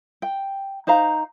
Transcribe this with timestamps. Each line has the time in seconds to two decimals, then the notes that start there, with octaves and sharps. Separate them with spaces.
0.22 G5
0.87 D#4 C5 F5 A#5